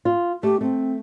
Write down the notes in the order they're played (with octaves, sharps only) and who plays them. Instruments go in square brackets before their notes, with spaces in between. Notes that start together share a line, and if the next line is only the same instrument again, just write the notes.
[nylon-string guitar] F4
[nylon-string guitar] A3 [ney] G4
[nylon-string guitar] A3 [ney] C4